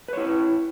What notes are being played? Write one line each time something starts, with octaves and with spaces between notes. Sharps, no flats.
E4 B4 C#5